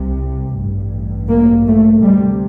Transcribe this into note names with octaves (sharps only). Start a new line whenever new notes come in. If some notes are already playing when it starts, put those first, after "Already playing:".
Already playing: C2 C3
A1 G2
A#3
A3
D2 C3 G3